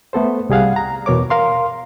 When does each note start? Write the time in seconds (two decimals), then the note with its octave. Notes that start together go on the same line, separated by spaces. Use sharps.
0.13 A3 B3 A4 C5
0.49 C2 G3 G#4 F5 F#5
0.76 A#5
1.06 E2 B2 A#4 C#5 D6
1.30 A#4 F5 C6